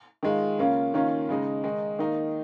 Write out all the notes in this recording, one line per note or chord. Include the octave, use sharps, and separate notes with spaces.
D#3 G#3 F4
C#3 A#3 C#4 F4
D#3 A#3 C#4 F4
C#3 G#3 D#4
D#3 G#3 D#4
D#3 A#3 D#4